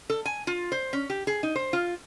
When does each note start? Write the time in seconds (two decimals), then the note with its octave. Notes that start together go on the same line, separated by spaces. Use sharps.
0.10 A4
0.25 G#5
0.47 F4
0.72 C5
0.93 C#4
1.10 G4
1.27 G#4
1.43 D#4
1.56 C5
1.73 F4